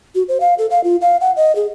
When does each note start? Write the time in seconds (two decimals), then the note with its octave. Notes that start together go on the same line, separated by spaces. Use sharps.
0.15 F#4
0.28 C5
0.40 F5
0.58 A4
0.70 F5
0.84 F4
1.01 F5
1.21 F#5
1.37 D#5
1.56 G#4